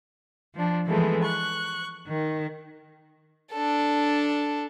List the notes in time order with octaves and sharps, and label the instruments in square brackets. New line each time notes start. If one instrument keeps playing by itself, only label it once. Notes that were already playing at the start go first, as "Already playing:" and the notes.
[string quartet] F3 D4
E3 F3 G#3 A3 B3
C#6 F#6
D#3
[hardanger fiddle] D4 A4